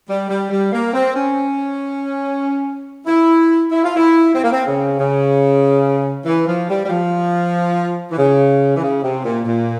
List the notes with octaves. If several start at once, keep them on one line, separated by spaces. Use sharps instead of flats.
G3
G3
G3
A#3
C4
C#4
E4
E4
F4
E4
C4
A#3
C4
C#3
C#3
E3
F3
G3
G3
F3
E3
C#3
E3
C#3
C3
A#2
A#2